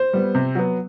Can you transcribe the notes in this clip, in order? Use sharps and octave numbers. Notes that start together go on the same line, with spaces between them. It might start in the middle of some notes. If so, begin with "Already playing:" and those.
Already playing: C5
G3 B3
C3
F#3 B3